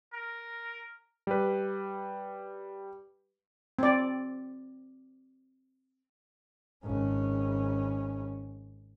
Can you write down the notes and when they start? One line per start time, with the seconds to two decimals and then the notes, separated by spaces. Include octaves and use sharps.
0.13 A#4
1.27 G3 B4
3.79 C4 D5
6.85 G#1 C#4